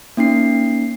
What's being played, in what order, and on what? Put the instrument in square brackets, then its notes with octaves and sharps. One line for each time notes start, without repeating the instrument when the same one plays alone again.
[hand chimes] A#3 C#4 D#4 C7